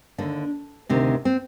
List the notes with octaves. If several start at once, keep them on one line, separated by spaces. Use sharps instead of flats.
D#2 D3 D4
D2 C3 D#3
C4